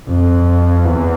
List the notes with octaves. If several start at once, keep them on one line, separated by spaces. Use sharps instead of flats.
F2
E2